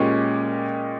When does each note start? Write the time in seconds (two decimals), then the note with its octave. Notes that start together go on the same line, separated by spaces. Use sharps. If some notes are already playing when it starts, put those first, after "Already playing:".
Already playing: A#2 G#3 C#4 G4